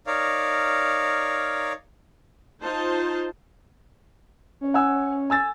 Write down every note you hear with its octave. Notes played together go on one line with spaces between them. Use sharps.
D#4 A#4 C#5 D5 F5
D#4 F4 C5 A5
C#4
F#5 G#5 E6
G#5 E6 A6